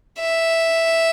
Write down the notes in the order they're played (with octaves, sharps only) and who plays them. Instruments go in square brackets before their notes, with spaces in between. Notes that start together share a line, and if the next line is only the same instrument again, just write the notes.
[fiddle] E5